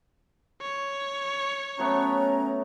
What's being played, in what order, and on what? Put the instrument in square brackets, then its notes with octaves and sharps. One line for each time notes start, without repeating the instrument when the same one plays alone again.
[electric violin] C#5
[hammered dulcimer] F#3 A3 B3 [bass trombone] C#4 [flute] A#5